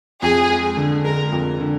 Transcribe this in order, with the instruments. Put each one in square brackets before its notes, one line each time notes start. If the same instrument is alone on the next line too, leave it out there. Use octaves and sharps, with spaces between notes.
[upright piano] F2 [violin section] G#4
[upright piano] G#3
D3
[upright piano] G#3 [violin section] A#4
[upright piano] F2
D3